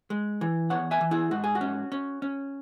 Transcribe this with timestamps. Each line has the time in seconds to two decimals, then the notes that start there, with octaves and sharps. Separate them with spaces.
0.10 G#3
0.41 E3
0.70 E2 C#5 F#5
0.91 E5 G#5
1.01 E3
1.11 E4 G#4
1.31 G#2 F#4
1.44 G#4
1.55 F#4
1.61 C#4
1.92 C#4
2.22 C#4